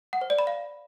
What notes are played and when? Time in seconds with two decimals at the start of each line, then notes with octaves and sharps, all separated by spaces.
0.13 F#5
0.21 C5
0.30 D5
0.39 B5
0.47 F5